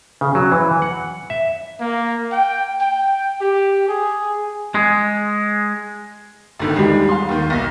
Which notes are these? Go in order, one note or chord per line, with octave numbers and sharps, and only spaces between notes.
C#3
F#3
E3
F#5
E5
A#3
G5
G5
G4
G#4
G#3
G#1 D3 D#3
D#2 G3 G#3
F5 C6
D#2 D#3
B1 A#6